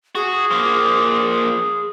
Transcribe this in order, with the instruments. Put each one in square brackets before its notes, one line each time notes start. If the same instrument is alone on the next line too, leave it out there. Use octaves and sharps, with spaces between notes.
[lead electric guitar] F#4 [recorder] G#4
[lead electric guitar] F3 A#3